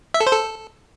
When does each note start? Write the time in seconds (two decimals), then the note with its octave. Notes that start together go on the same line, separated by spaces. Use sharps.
0.14 E5
0.20 A4
0.27 C5
0.33 A4